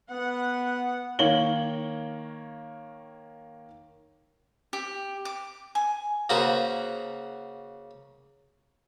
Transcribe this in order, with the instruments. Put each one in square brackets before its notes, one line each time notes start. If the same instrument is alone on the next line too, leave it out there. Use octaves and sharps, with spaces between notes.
[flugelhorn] B3 [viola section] F#5
[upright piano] D#3 A#3 C#5 F#7 G7
[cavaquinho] G4
D6
G#5
[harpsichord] C#3 A#3 F#4 B4 C5 A#5